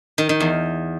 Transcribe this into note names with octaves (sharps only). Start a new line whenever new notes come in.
D#3
D#3
E2